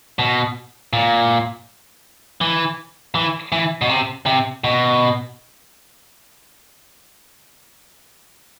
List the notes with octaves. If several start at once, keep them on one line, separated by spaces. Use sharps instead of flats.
B2
A#2
E3
E3
E3
B2
C3
C3
B2